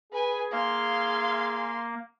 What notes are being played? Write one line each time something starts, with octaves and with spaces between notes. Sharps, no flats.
G#4 B4 G#5
A#3 F5 C6